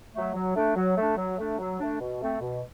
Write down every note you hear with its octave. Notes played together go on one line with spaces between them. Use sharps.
F#3 A3
F#3
A3 D4
F#3
A3 D4
F#3
A3 D4
F#3
A3 D4
B2
A3 C4
B2